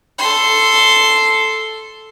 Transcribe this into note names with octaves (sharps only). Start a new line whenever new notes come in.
A4 C6